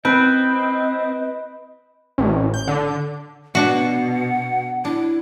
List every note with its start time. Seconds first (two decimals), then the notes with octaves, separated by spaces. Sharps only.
0.05 C4 B4 D#5
2.18 A1
2.54 G6
2.68 D3
3.55 B2 D4 F#4 F#5
4.85 D4 E4